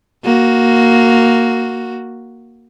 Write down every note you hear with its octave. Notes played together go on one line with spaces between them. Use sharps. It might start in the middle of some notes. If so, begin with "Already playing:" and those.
A#3 F#4